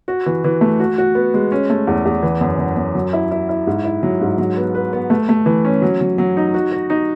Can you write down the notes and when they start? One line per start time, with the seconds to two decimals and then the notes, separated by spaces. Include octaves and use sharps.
0.08 F#4
0.26 E3
0.44 E3
0.61 A3
0.80 F#4
0.98 F#4
1.15 B3
1.34 G#3
1.52 C#4
1.70 A3
1.87 E2
2.05 E2
2.23 E3
2.41 F#2
2.59 F#2
2.77 F#2
2.95 F#3
3.13 E4
3.31 E4
3.49 E4
3.67 G#2
3.85 E4
4.03 F#3
4.21 G#2
4.38 F#3
4.57 B3
4.75 B4
4.93 B3
5.10 A3
5.29 A3
5.46 E3
5.65 C#4
5.82 F#3
6.01 F#3
6.18 F#3
6.37 D#4
6.54 F#4
6.72 F#4
6.90 D#4